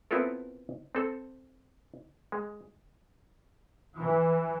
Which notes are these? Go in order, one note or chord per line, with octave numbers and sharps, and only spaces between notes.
B3 C4 E4 F4 A4 A#4
C4 A4
G#3
E3